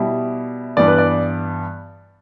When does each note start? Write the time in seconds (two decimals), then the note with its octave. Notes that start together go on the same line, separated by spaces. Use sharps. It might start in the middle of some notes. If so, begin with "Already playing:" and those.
Already playing: B2 G3 E4
0.77 G2 E3 B3 D5
0.88 B4
0.98 D5